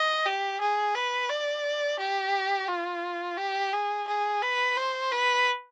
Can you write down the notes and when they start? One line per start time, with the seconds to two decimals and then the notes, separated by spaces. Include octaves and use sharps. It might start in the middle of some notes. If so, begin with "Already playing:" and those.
Already playing: D#5
0.26 G4
0.61 G#4
0.95 B4
1.29 D5
1.99 G4
2.68 F4
3.37 G4
3.73 G#4
4.07 G#4
4.42 B4
4.77 C5
5.12 B4